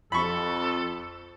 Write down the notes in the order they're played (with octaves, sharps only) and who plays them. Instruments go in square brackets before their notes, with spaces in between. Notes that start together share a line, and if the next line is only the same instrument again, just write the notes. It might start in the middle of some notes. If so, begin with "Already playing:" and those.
[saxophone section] F2 [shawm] A4 [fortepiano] B5 C#6